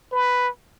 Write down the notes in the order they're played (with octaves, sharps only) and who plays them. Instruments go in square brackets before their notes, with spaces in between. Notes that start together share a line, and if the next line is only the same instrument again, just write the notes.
[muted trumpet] B4